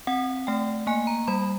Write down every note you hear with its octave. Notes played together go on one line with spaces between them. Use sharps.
C4 F#5
A3 G5
A#3 G#5
A#5
G3 B5